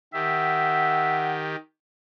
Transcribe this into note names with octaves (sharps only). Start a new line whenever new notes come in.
D#3 G4 E5 F#5